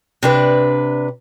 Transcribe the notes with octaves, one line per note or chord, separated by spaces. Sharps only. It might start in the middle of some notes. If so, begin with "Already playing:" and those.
C3 D4 B4